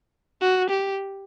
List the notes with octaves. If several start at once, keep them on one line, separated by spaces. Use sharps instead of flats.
F#4
G4